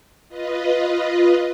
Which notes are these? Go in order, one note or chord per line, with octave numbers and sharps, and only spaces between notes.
F4 B4 D#5